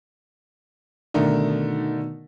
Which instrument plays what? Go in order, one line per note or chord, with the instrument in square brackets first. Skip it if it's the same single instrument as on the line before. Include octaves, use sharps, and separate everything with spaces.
[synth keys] B2 D#3 D#4 [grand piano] D3 A3 A#4